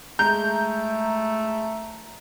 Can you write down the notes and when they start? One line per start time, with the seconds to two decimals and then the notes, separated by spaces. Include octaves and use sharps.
0.19 G#3 A3 A#5 G6